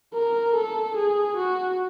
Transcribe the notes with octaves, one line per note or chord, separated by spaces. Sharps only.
A#4
A4
G#4
F#4